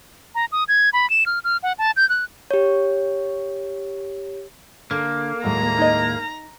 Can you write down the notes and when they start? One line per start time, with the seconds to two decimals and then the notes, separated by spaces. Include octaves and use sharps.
0.35 A#5
0.52 D#6
0.68 G#6
0.93 B5
1.10 E7
1.26 F6
1.44 F6
1.63 F#5
1.78 A5
1.96 G6
2.09 F#6
2.51 G4 C#5
4.91 D3 A#3
5.44 D#2 A2 F#3 G#3 A#5
5.78 D#4 D#5